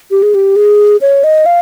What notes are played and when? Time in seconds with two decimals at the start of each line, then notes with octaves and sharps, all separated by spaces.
0.11 G4
0.23 G#4
0.35 G4
0.56 G#4
1.01 C#5
1.24 D#5
1.46 F5